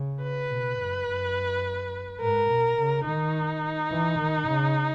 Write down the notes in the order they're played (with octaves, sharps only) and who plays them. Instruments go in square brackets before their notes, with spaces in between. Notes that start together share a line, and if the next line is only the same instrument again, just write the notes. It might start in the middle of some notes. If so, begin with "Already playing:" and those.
Already playing: [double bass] C#3
[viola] B4
[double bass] B2
F#2
F#2
[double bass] G#2 [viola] A#4
[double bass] B2
C#3
[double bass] D#3 [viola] D#4
[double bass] E3
D#3
C#3